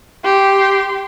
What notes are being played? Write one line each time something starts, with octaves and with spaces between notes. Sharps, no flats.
G4 C6